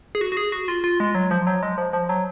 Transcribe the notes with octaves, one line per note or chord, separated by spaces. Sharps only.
G#4
F#4
F#4
G#4
F#4
F4
F4
G#3
F#3
F3
F#3
G#3
F3
F3
F#3